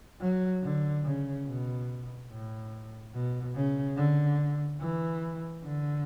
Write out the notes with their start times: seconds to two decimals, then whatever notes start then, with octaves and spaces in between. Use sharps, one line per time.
0.20 F#3
0.63 D3
1.04 C#3
1.46 B2
2.29 A2
3.13 B2
3.55 C#3
3.97 D3
4.80 E3
5.63 D3